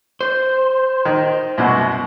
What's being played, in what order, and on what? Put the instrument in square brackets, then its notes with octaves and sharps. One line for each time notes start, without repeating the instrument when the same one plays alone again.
[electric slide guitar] C5
[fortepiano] D#3
C2 F#2 B2